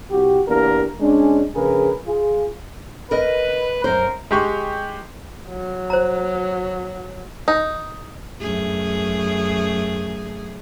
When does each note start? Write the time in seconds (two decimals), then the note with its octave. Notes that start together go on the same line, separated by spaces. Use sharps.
0.10 C2 F#4 G4
0.48 E2 A#3 D4 G4 A#4
1.00 G#3 C#4 D4
1.55 A#1 C#3 G#4 A#4 B4
2.07 F4 G#4
3.11 A#4 B4 D#5
3.84 F#2 A#4 C5
4.31 G#3 G4 C#6
5.49 F#3
5.90 C5 A#5
7.48 D#4
8.40 F#2 A3 G#4